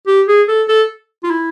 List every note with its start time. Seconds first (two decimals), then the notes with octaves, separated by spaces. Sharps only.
0.07 G4
0.28 G#4
0.48 A4
0.68 A4
1.24 F4
1.30 E4